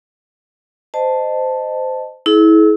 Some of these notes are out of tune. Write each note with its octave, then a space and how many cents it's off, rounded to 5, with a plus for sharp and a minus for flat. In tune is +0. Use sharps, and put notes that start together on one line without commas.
C5 -20 D#5 -20 A5 +0
E4 -30 G#4 +40